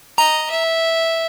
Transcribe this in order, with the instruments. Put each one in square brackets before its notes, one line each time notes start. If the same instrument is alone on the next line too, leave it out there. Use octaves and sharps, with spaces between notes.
[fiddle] D#5 [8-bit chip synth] A#5
[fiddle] E5